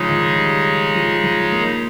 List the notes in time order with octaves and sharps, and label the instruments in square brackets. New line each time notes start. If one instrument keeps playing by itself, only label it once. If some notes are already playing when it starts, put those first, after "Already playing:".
Already playing: [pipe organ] C#3 G#3 D#4 G#4 C#5 [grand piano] F3
[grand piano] D#3
G3
F3
F3
A#3